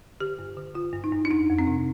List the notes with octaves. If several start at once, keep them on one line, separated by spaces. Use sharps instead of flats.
D3 G4
G2
D3
D3 F4
G2
D#4
G2
D4
F2 D#4
F2
C4
C3